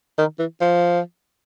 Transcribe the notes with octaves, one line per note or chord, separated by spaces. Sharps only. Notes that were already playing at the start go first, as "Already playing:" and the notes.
D#3
E3
F3